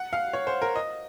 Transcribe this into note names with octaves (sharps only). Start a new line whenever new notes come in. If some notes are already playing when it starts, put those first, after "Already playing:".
Already playing: F#5
F5
C#5
C5
A#4
D#5